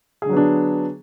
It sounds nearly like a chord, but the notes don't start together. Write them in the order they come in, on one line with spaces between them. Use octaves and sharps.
G#4 D3 F#3 B3 D4